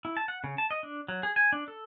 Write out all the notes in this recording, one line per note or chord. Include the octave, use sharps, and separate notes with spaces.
E4
A5
F#5
C#3
A5
D#5
D4
F#3
G#4
G#5
D4
A4